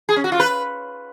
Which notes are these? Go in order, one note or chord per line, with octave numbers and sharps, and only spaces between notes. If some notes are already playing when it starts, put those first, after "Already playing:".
G#4
C#4
F#4
F4
B4